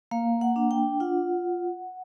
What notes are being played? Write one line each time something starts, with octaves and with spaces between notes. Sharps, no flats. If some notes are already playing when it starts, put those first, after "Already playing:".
A#3 F5
F#5
D4
G5
F4 F#5